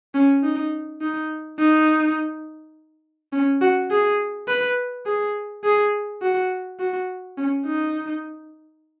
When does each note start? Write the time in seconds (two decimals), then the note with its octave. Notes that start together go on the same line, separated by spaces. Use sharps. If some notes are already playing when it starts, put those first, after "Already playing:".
0.14 C#4
0.43 D#4
1.01 D#4
1.59 D#4
3.33 C#4
3.61 F#4
3.91 G#4
4.48 B4
5.06 G#4
5.64 G#4
6.22 F#4
6.80 F#4
7.37 C#4
7.66 D#4